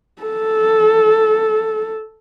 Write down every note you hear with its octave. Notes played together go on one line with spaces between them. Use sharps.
A4